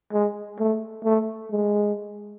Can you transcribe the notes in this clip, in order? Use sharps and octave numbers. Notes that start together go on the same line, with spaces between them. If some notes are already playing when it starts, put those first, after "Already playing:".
G#3
A3
A3
G#3